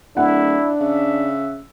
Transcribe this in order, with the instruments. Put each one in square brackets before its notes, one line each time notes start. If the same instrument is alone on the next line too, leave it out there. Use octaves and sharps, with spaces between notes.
[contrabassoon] D1 [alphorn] D4 [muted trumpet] E4 [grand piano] F#5
[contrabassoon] C#3 [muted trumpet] E5